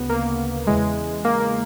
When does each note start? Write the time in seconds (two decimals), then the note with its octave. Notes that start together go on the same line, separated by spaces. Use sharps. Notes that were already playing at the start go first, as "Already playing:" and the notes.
Already playing: D2 C#3 B3
0.10 A#3
0.67 E2 C#3 E3 G#3
1.25 A#3
1.40 A#3